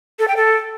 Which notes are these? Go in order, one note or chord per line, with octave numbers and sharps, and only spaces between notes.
A4
G5
A4